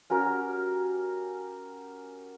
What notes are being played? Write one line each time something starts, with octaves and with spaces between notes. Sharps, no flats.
C#4 F#4 G4 A#4